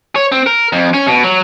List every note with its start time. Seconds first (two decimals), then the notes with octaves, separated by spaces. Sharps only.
0.16 C#5
0.32 C4
0.46 A#4
0.73 F2
0.94 C#4
1.08 B2
1.24 F#3